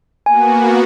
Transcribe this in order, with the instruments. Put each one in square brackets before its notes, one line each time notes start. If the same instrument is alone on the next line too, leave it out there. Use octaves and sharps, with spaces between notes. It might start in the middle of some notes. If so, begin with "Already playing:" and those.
[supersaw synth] A#3 B3 F#4 [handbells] G#5